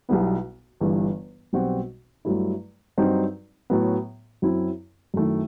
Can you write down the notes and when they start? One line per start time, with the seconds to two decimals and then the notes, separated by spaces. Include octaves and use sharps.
0.09 B1 B2 G3 B3 E4
0.81 G1 G2 E3
1.53 B1 B2 G3 C4 F#4
2.25 G2 F#3 A3 E4
2.97 G2 F#3 C4 D#4 F#4
3.70 A2 F#3 B3
4.42 F#2 F#3 C4 E4
5.14 F#2 D#3 A3 E4